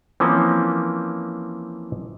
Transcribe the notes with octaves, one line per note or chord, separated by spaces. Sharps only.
E3 F3 A#3 C4 C#4